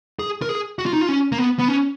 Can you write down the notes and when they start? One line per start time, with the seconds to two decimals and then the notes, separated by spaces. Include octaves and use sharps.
0.19 G#4
0.42 A#4
0.49 G#4
0.79 F#4
0.86 F4
0.93 D#4
1.01 F4
1.09 C#4
1.32 A#3
1.38 B3
1.59 B3
1.68 C#4